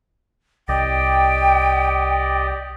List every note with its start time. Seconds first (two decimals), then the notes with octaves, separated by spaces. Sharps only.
0.69 C2 G4 D5 D#5 G5